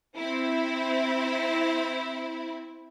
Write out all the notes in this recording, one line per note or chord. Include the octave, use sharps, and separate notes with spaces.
C4 E4